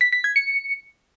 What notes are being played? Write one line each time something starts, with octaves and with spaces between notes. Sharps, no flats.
B6
B6
G#6
C#7